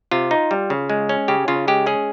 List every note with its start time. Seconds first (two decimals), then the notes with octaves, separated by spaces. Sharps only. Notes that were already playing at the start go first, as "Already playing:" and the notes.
0.11 C3 F4
0.31 D#4
0.51 G3
0.70 C#3
0.90 G#3
1.09 C#4
1.28 C#3 G4
1.48 C#3 F4
1.68 G#3 G4
1.86 C#4 G#4